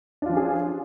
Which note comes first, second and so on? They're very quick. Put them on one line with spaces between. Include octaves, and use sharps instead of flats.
D4 F4 F3 C#4 G#4